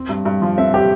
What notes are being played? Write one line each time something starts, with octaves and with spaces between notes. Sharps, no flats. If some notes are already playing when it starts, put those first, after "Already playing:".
Already playing: C4
G2
G2
F3
C4 E5
G4